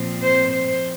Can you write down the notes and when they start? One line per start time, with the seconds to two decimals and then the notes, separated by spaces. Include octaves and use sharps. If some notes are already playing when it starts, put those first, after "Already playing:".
Already playing: A#2 F3 C4
0.22 C5
0.52 C5